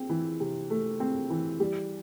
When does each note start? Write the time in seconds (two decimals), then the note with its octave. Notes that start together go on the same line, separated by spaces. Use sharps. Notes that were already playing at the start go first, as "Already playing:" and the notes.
Already playing: C4
0.09 E3
0.40 C3
0.70 A3
1.00 C4
1.30 E3
1.60 G3